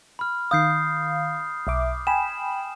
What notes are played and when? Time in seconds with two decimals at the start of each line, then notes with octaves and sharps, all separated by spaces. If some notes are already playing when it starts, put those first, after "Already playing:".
0.19 B5 F6
0.51 D#3 F5 D#6 G6 C7
1.67 B1 E5 D6
2.07 G5 G#5 B5 E7